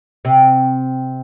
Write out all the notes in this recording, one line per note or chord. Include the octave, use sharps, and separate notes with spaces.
C3